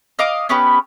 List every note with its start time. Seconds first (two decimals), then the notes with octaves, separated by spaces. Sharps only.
0.19 D#5 F5 D6 D#6
0.49 B3 C#4 G4 B4